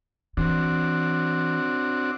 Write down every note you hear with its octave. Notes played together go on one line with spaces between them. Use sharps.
E3 C4 D4 F#4